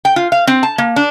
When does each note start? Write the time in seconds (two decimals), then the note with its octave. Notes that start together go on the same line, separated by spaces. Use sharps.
0.05 G5
0.16 F4
0.32 F5
0.47 C4
0.63 A5
0.78 A#3
0.96 D4